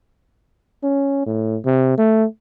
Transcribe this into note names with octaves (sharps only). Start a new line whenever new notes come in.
C#4
A2
C3
A3